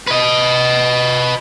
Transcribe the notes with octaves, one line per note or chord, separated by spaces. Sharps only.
B4 D#5